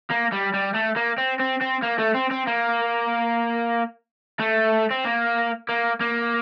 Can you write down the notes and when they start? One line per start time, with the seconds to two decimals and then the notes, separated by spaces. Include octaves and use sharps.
0.10 A#3
0.32 G3
0.54 G3
0.75 A3
0.96 A#3
1.18 C4
1.39 C4
1.61 C4
1.82 A#3
1.98 A3
2.14 C4
2.31 C4
2.47 A#3
4.40 A3
4.91 C4
5.05 A#3
5.69 A#3
6.00 A#3